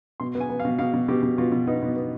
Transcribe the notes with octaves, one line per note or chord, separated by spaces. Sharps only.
B2 C6
B3
G#5
B3
F5
B2
B2 F5
B2
B2 G4
B2
B2 F4
B2
B3 D#4
B2
B3